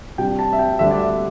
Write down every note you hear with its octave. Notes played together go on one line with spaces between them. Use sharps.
C3 G3 D4 G5
A5
E5
G5
D2 D3 G3 D4 E5
D5
E5